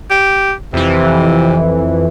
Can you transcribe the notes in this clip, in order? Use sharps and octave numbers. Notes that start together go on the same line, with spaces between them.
G4
F2 C3 E3